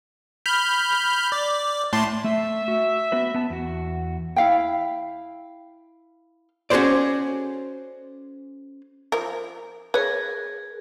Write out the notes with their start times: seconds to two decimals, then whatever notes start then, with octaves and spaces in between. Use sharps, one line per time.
0.46 B5 F6 G6
1.32 D5
1.93 A2 A5 C6
2.24 A3 E5
2.68 F#4
3.12 B3 F#4 B4
3.34 B3 A5
3.50 E2 F#4
4.36 E4 F5 G5
6.70 C#4 F#4 G#4 A4 C5 D5
9.12 F3 A#4
9.94 G#4 A#4 B4 C#5